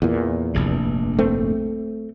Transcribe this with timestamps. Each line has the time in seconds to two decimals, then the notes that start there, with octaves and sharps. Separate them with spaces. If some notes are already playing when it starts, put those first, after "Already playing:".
0.02 E2 A#2
0.54 F1 A#1 G2
1.19 A3 C4